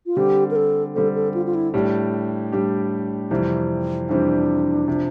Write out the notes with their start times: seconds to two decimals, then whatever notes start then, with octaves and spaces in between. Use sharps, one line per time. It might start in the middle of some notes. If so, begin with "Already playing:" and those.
0.06 F4
0.17 D3 G3 C4 G4
0.51 A#4
0.56 A4
0.95 D3 G3 C4 A4
1.15 A4
1.34 F4
1.46 F4
1.55 E4
1.74 A2 G3 D4 G4
2.52 A2 G3 D4 G4
3.31 F2 C3 E3 G3 C4
4.09 F2 C3 E3 G3 C4 D4
4.88 C3 F3